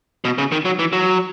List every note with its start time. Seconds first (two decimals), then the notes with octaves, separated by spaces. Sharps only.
0.25 B2
0.38 C#3
0.52 D#3
0.65 F#3
0.79 E3
0.93 F#3